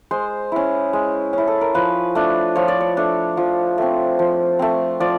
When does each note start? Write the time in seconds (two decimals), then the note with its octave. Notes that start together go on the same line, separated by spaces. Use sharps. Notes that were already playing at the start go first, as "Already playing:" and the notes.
0.11 G#3 C5
0.52 C#4 E4
0.93 G#3
1.33 C#4 E4
1.47 A4
1.61 A#4
1.74 F3 B4
2.15 A3 D4
2.55 F3 C#5
2.68 D5
2.80 C#5
2.97 A3 D4
3.37 F3
3.78 A3 C4
4.19 F3
4.59 A3 C4
5.00 F3 D5